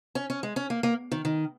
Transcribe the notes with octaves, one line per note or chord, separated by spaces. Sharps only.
C#4
C#4
G#3
C#4
A#3
A#3
D#3
D#3